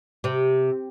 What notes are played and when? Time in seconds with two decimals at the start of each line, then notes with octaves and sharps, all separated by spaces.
0.24 C3